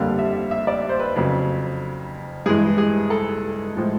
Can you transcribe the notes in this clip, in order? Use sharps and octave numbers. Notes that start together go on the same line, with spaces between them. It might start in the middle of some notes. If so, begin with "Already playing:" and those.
Already playing: F2 D3 G3 A#3 F5
E5
E5
D5
C5
B4
F2 C#3 F#3
G2 E3 G#3 G#4
G#4
A4
A2 F3 G#3